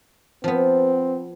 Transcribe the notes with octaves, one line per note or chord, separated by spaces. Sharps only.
F3 B3 C4